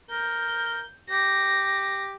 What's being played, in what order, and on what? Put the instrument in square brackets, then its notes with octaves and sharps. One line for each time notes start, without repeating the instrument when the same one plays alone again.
[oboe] A#4 [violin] G6
[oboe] G4 [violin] A#6